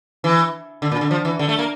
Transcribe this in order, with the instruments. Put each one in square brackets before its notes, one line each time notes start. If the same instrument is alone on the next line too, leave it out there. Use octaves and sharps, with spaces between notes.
[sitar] E3
D3
A#2
D3
F3
E3
D3
A3
A#3